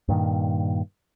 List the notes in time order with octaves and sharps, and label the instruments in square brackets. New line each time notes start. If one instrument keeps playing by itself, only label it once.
[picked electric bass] G2 A#2 D#3